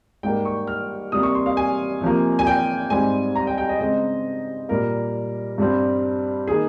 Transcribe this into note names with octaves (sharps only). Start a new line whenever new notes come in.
G#2 G3 A#3 G5
C#6
F6
C3 G3 A#3 D#6
C#6
C6
F5
G#5
C3 F3 A#3
G#5
G5
G#2 G3 C4 G#5
A#5
G5
G5
D#5
C#3 G#3 C4 D#5
A#2 G3 A#3 A#4
G2 G3 C4
D#3 A#3 G#4